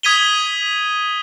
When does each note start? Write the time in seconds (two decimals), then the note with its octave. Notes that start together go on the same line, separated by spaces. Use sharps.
0.03 D#6 G#6 B6 D#7 F7 G7